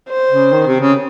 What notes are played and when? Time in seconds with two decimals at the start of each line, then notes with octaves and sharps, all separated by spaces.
0.10 C5
0.31 C#3
0.52 D#3
0.67 C3
0.80 C#3